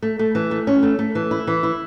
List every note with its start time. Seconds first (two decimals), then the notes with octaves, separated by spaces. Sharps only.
0.02 A3
0.19 A3
0.35 E3
0.51 A3
0.67 C#4
0.83 A3
0.99 A3
1.15 E3
1.31 E4
1.47 E3
1.63 E4